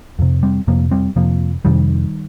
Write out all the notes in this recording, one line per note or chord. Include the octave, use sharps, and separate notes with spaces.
F2 C3
G3 C4
F2 C3 F3 A#3
G3 C4
F2 C3 F3 A#3
F2 C3 D#3 G3